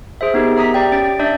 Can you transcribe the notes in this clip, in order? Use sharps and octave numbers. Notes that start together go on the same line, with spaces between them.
G#4 C5 E5
B3 D#4 G4 A#4
E5 A#5 D#6 B6
G4 D5 G5
C#4 A6 D7
D4 D5 E5 G6